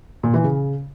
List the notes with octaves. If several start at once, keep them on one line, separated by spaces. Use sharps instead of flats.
A#2
E3
C#3